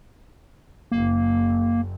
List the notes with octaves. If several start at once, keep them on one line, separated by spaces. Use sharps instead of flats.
F#1 A#3